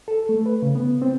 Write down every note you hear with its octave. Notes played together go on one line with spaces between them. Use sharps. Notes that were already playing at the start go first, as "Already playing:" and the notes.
A4
A3
B4
C#3
B3
C4